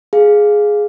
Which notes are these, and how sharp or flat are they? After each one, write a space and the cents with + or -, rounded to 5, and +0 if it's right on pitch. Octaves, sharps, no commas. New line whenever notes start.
G#4 +5 F5 +0